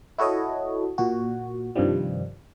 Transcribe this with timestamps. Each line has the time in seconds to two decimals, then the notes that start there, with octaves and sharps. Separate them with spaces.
0.18 E4 F#4 A4 C#5 D#5
0.98 A#2 F#4
1.76 G2 C3 D#3 F3 G3